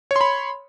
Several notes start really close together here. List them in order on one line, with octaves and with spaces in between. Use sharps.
C#5 C6 B5